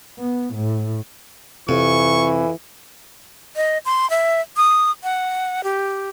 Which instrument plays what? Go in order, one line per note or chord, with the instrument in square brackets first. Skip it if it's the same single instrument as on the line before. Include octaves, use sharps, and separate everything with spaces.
[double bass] B3
A2
[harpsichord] F2 [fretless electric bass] C3 [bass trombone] E3 [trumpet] C#6
[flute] D#5
C6
E5
D#6
F#5
G4